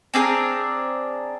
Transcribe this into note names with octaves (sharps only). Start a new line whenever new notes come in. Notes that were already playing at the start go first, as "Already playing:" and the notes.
C4 D4 G#4 A#4